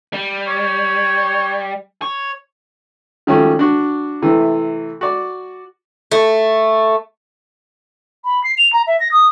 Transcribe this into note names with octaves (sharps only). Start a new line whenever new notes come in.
G3
C#5
C#5
D#3 F3 G3 A3 C#4 F#4
D4 F#4
C3 E3 A3
F#4 D5
A3
B5
C7
F7
A#5
E5
A#6
D#6